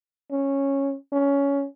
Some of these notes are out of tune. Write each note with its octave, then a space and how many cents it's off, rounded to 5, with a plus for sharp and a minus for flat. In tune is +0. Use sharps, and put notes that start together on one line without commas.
C#4 -10
C#4 +15